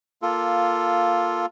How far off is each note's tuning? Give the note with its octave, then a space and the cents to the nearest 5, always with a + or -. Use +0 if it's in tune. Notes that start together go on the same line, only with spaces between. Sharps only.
A#3 +0 F4 +0 A4 +0